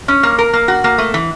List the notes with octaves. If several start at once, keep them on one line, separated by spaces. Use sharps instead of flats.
C#4
A#3
A#4
A#3
F#4
A#3
A3
E3